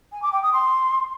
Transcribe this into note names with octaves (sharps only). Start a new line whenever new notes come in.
G#5
D6
G5
D#6
C6